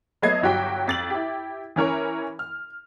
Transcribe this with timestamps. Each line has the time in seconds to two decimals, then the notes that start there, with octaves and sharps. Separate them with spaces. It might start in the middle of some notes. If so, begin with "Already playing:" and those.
0.22 F#3 A3 B3 D#5 G#6 C7
0.42 G1 F#3 F#4 G4 G5 B6
0.87 F2 A6 F#7
1.10 E4 G4
1.76 E3 C#4 A#4 C#5
2.39 F6